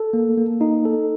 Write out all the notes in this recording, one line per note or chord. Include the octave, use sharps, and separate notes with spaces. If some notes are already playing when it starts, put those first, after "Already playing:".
Already playing: A4
A#3
A#3
D#4
A4